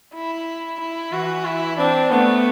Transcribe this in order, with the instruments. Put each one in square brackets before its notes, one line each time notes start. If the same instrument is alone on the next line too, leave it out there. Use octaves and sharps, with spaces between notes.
[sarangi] E4
E4
[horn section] E3 [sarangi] F#4
[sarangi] E4
[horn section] C4 [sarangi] D4
[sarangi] A3 [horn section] B3